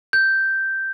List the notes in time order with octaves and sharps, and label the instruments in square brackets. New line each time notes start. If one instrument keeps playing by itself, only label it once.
[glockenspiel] G6